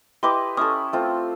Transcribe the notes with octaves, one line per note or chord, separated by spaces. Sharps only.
E4 G4 B4 D#5 C6 D6
C#4 E4 A4 C#6 D#6
A3 C4 F4